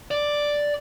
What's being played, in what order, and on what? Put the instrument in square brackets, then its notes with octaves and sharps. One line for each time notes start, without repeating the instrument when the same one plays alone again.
[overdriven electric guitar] D5